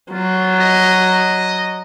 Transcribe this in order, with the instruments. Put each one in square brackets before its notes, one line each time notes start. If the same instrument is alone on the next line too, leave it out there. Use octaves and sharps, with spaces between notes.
[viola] F#3 [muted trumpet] F4
[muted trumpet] D#5